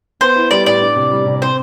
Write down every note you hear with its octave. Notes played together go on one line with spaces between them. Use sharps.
B3 C5
E4
G3 D5
A2 D5
D4
C3
G3
C3
C4 C5